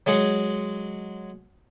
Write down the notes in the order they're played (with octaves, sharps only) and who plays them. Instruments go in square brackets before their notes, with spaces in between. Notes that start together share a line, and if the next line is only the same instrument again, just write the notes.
[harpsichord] F#3 G#3 G#4 F#5